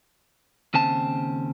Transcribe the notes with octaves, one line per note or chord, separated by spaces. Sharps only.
D#2 C#3 C4 A5